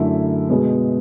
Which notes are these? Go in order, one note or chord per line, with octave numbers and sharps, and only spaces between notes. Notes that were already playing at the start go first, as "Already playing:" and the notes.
Already playing: F#2 D3 A3 E4
B2 G#3 B3